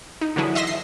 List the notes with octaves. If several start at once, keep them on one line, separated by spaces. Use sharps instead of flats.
D#4
D3 E3 F#3 E4 G#4
D#5 E5 C6 A#6
C7